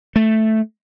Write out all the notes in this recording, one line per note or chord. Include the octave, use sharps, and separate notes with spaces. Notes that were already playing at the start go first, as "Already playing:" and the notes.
A3